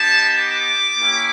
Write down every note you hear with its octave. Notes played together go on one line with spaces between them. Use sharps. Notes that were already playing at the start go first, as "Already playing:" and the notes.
Already playing: B3 D#4 G4 A5
D6
A#3 C#4 E4 G4